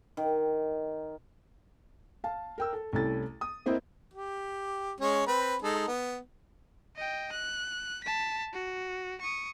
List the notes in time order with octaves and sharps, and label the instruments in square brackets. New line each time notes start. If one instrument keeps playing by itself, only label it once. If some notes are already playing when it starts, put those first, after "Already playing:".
[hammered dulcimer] D#3
[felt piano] F5 A5
A#4 G5 E6
A4
C2 A3 C#4 E4 A4 A6
D#6
A#3 C4 E4 C5 D#5 E5
[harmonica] G4
G#3 C#4 C#5
C4 B4
G#3 D#4 A4
B3
[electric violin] D#5 G5
F#6
A5 B6
F#4
C#6 D#6